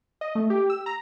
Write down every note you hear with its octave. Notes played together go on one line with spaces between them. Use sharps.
D#5
A3
G4
E6
A#5